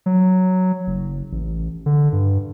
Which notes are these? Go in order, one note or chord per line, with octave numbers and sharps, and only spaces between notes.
F#3
F#1
A1
D3
G2